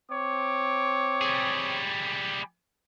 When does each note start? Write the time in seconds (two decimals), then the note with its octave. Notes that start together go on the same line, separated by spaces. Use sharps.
0.11 C4 C#5 D6
1.21 G3 G#4